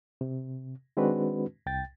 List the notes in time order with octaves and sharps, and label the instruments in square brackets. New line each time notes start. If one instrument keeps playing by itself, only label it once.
[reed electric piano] C3
D#3 G#3 C4 D4 F#4 B4
C2 G5 A6